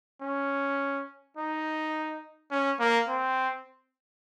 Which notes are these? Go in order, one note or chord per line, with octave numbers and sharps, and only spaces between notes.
C#4
D#4
C#4
A#3
C4